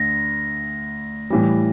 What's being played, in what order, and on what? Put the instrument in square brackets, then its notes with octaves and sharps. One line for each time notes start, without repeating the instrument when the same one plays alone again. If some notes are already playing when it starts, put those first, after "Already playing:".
Already playing: [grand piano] D2 [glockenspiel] A#6
[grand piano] A2 E3 G3